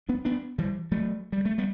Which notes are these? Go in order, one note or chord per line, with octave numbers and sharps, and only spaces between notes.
B3 D4
B3 D4
E3 G3
F#3 A3
G3
A3
G3 B3